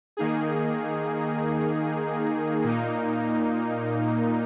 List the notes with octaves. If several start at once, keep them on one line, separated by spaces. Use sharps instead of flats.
D#3 A#3 D#4 G#4
A#2 A#3 D#4